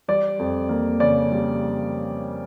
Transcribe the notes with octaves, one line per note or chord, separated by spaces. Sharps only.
G3 D5
F2
A#3
C#3 D5
G3